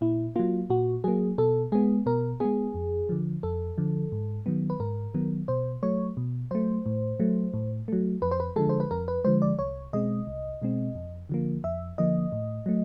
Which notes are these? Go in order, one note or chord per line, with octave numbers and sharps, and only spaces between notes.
A#2 E4
F#3 A#3 F4
A#2 F#4
F#3 A#3 G#4
B2 A4
G#3 B3 G#4
B2 A#4
G#3 B3 G#4
F2
D3 F3
F2 A4
D3 F3
G#2
D#3 F#3 B3
B4
G#2 A#4
D#3 F#3 B3
B2 C5
F#3 A3 C#5
B2
F#3 A3 C5
A2
F#3 A3
A2
F#3 A3
F2 B4
C5
B4
D3 F3 G#3 A4
C5
B4
F2 A#4
B4
D3 F3 G#3 C5
D5
C2 C#5
B2 G#3 C4 D#5
C2
B2 G#3 C4
F2
D3 F3 A#3
F2 E5
D3 F3 A#3 D#5
A2
F#3 A3